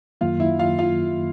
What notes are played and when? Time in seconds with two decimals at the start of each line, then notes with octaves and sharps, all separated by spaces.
0.21 F#2 D#3 F#3 A#3 F4 F5
0.40 E4 E5
0.59 F4 F5
0.78 F4 F5